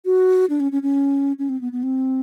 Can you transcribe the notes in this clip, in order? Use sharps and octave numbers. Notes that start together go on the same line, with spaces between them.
F#4
D4
C#4
C#4
C#4
C#4
C4
B3
B3
C4